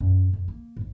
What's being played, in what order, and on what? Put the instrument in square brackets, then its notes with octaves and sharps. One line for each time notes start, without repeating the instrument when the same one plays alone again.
[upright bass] F#2
F2
A#3
A1 G#2